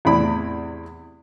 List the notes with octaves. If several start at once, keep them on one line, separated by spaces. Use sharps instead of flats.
E2 A2 C3 E4 D5 B5